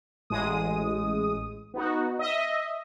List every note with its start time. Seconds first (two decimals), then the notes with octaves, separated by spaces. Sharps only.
0.30 A1 G#3 D#6
1.74 B3 D#4 F#4
2.19 D#5 E5